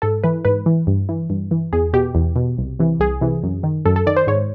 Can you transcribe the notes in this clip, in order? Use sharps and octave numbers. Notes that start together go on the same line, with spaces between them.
G#2 A4
E3 B4
G#2 B4
E3
G2
E3
G2
E3
E2 G#4
B2 G4
E2
B2
C2
C3 E3
C2 G#4
C3 E3
F#2
D#3
F#2 A4
A4
D#3 D5
C5
G#2 C#5